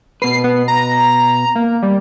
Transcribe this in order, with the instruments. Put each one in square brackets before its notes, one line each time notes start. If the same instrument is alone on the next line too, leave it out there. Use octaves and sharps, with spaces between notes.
[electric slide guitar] B2 B4 [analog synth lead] C7
[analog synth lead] B3
A#5
A#3
G3